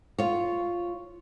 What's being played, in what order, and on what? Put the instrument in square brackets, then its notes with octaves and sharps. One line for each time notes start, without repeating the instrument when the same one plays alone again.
[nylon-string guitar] F4 C#5